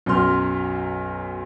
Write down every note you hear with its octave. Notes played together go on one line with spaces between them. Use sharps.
B1 F#2 F#3 C6 F6